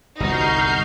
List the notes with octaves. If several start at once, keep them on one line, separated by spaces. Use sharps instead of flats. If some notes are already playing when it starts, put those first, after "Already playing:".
G1 C2 D#4 F#4 F6 G6 C7